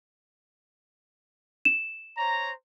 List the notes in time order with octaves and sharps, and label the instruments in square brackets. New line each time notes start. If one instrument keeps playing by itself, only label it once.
[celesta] E7
[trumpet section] C5 C#5 A#5